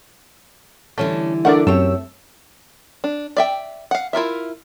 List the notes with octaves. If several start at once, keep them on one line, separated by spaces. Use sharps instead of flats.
D3 E3 G3 A3 C#4
A3 D4 A#4 D5 F#5
F#2 A3 C4 G4 C#5 E6
D4
D5 E5 G5
F5 F#5
E4 F4 A#4 E5